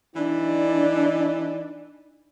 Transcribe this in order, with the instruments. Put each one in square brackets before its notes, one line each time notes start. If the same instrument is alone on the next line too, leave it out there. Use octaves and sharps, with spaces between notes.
[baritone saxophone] E3 [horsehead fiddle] D4 D5 [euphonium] D#4